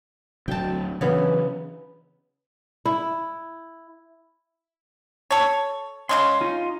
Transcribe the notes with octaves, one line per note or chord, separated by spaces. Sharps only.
D2 F#3 D4 G5 A5
C#3 E3 F#3 B3 D4
E4
A4 C#5
C#3 G#3 C#4 C6
D#4 F4